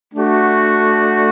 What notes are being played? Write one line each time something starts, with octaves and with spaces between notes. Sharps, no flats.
A3 D4 F#4